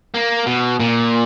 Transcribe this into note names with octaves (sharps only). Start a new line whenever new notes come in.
A#3
B2
A#2